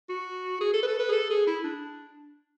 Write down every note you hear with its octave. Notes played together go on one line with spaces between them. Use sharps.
F#4
G#4
A4
B4
A4
B4
G#4
A4
G#4
E4
D4